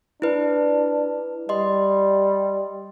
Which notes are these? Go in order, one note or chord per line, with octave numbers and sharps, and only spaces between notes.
D4 E4 B4
G3 D#5 C6